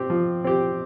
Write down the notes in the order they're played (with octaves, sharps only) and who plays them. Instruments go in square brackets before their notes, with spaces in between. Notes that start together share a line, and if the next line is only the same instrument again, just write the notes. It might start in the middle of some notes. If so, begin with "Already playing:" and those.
Already playing: [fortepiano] C4 G4
F3
C4 G4